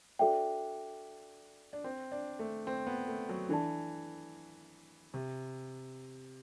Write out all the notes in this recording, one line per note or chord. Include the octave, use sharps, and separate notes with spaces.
D4 F#4 A4 E5 G5
D4
C4
D4
A3
C4
B3
A3
F#3
E3 D4 A4 D5 A5
C3